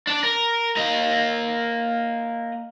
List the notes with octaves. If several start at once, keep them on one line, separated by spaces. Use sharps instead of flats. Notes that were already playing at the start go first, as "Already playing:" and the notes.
D4 D5
A#4
A#3 D#5